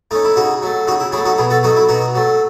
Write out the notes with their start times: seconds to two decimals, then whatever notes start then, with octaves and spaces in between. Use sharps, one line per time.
0.11 A3 C#4 D#4
0.24 E4
0.36 C#3 D#4 F#4
0.62 F#3 A3
0.87 C#3 D#4 F#4
1.00 E4
1.12 F#3 E4 G#4
1.17 A3
1.25 D#4 F#4
1.38 B2 E4 G#4
1.50 F#4 A4
1.63 F#3 A3 D#4 F#4
1.76 E4
1.89 B2 D#4 F#4
2.15 F#3 A3